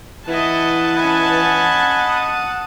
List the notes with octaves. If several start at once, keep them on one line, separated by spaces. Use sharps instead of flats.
E3 E4 D#5 F#5 A5
C#4 D#5 G#5 B5
D#6